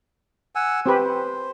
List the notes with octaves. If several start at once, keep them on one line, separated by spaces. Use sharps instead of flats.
F#5 G#5 E6
C4 G4 B4 C5